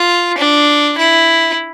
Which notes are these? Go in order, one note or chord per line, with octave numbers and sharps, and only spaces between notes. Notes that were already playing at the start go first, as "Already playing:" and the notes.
Already playing: F4
D4
E4